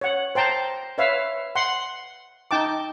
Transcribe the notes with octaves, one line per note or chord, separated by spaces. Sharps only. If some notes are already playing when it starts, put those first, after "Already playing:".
C#5 F#5
C5 G5 A5 A#5
B4 C#5 E5 F5
F#5 C6
D#4 G5 A5 D6